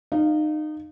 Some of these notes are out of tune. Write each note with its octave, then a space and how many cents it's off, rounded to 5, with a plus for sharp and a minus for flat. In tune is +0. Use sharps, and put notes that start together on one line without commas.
D#4 -25 F5 +0